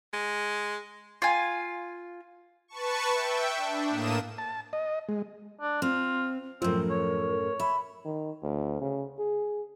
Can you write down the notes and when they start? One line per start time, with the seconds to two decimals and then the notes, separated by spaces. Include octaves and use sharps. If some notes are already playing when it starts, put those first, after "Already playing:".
0.13 G#3
1.22 F4 G#5
2.68 B4 A5 C#6
3.12 E5 G5
3.56 D4
3.89 A2 A#3 D#6 E7
4.38 A5
4.73 D#5
5.09 G#3
5.61 D4
5.82 C4 F4
6.62 F#2 A2 F3 C4 A#4
6.91 C#5
7.60 E5 B5
8.05 D#3
8.42 D2
8.81 C#3
9.19 G#4